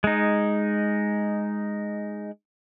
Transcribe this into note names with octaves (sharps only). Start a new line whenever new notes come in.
G#3 D#4